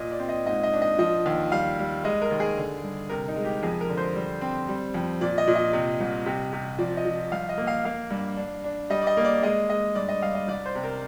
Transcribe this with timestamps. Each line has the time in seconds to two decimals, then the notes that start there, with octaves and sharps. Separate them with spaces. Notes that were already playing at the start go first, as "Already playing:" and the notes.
Already playing: A#2 D#5
0.11 D5
0.19 C4
0.29 D#5
0.46 G#2 D#5
0.63 D#5
0.73 D4
0.82 D#5
0.99 F3 D#5
1.26 D#2
1.51 G3 F5
1.79 G3
2.04 G#3 D#5
2.22 A#4
2.31 D#2
2.40 G#4
2.57 D3
2.83 G2
3.09 C3 A#4
3.28 D#4
3.36 G#3
3.45 G4
3.63 F2 G#4
3.81 A#4
3.89 D3
3.97 C5
4.15 G3
4.41 C4
4.68 G3
4.94 F2
5.21 A#2 D5
5.38 D#5
5.47 A#2
5.55 D#5
5.73 C3
6.01 C2
6.26 C3
6.53 C3
6.79 F3 D5
6.97 D#5
7.05 F3
7.32 C2 F5
7.49 D#5
7.58 A#3
7.67 F5
7.85 A#3 F5
8.10 G2
8.37 D4
8.64 D4
8.90 G3 D#5
9.02 D5
9.07 D#5
9.17 A#3
9.25 D5
9.42 G#3 D#5
9.69 G#3 D#5
9.95 G2 D5
10.09 D#5
10.22 G2 F5
10.35 D#5
10.48 C2 D5
10.66 C5
10.75 C3
10.84 A#4